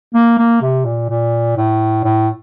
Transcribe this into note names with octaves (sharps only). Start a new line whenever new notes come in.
A#3
A#3
C3
A#2
A#2
A2
A2